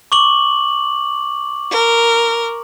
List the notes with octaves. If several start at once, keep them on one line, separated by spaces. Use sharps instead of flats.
C#6 D6 F#7
A#4